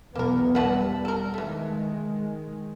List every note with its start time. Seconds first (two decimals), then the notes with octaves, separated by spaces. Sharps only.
0.16 B1 E2 A#3 B3 A#4
0.55 G3 B4 F#5 A5
1.05 A4 A#4
1.34 D#3 E3 G#3 A3